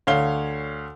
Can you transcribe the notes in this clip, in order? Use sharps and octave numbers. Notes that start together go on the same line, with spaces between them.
D2 C#5 F5 G7